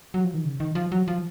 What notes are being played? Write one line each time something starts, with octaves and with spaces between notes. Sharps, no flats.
F#3
F3
D#3
C#3
D#3
F3
F#3
F3